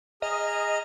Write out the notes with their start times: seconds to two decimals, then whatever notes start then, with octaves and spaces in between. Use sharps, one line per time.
0.22 G#4 D#5 A#5 F6